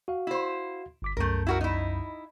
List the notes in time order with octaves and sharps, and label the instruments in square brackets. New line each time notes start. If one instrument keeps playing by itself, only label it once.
[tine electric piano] F#4 F5
[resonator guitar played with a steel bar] E4 C5
[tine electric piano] G1 D6 B6
[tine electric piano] C2 F#2 G6 [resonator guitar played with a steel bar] A3 A#4
[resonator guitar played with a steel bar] E4 F#4 A#4
D#4 E4